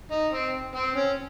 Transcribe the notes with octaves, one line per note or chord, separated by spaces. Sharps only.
D#4
C4
C4
C#4